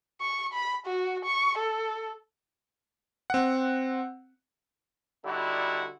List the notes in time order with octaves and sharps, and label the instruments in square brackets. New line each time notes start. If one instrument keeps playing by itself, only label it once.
[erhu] C#6
B5
F#4
C#6
A4
[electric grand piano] C4 F#5
[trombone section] D3 G3 D#4 E4 F#4